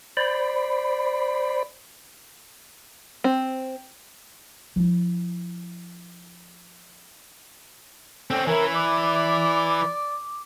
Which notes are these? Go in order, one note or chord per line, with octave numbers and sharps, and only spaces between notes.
C5 D5 B5
C4
F3 E4
D3 C4 C#4 G5
E3 C#4 E4 A#4
D5 D6